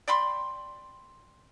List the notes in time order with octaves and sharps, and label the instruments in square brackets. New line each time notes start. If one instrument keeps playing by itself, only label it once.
[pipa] D5 G5 B5 C6